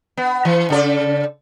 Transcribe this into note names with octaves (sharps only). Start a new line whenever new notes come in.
B3
E3
C#3 A4 D5